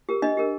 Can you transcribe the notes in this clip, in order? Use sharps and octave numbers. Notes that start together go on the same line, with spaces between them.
G4 A#4
D4 D#5
G4 A#4